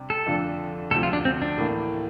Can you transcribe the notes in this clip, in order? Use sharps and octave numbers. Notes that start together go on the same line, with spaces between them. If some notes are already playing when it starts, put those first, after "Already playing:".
Already playing: C3 G3 D4
A4
F2 D3 A3 D4 F4
D2 C3 F3 A4
F4
D4
C4
D4
A2 E3 A#3